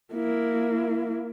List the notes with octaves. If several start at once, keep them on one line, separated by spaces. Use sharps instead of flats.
A#3 E4